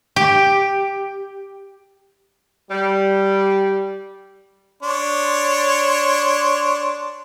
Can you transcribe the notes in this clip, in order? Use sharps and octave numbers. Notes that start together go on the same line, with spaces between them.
G4
G3
D4 C#5 C6